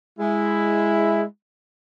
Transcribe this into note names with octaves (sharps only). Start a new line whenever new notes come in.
G#3 E4